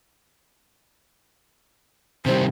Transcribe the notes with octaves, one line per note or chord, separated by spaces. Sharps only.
C3 D#3 G3 C5